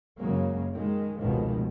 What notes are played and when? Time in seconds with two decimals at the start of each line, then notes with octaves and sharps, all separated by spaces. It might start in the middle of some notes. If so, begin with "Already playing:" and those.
0.19 F#2 C#3 F#3 G#3 A#3
0.73 D#3 G#3
1.20 F1 C#2 B2 D#3 F3